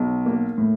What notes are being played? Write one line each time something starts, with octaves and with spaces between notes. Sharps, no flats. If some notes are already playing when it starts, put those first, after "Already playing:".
Already playing: B1
A#3
A2